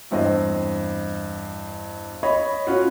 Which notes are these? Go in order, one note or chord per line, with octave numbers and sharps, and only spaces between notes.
E2 G2 C4 D#5
C#5 D#5 B5
C#4 F4 F#4